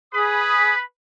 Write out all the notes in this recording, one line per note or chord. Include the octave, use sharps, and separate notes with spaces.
G#4 B4 B5 D#6